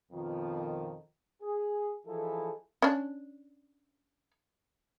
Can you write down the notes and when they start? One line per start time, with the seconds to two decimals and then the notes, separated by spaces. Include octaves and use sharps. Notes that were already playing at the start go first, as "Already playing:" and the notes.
0.12 F2 B2 D#3 F3
1.42 G#4
2.07 E3 F3 D#4 E4 G#4 A4
2.82 C#4 D4